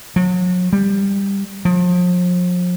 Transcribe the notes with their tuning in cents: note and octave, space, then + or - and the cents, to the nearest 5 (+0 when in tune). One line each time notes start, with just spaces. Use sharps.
F#3 -35
G3 +15
F3 +40